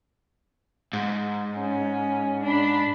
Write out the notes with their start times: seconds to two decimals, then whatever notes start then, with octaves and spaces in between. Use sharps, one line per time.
0.93 G#2
1.56 C#4
2.44 D4 B5